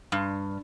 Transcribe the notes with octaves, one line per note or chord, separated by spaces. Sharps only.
G2